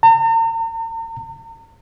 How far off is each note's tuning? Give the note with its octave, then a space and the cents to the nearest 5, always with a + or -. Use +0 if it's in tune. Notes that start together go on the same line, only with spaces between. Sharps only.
A#5 -45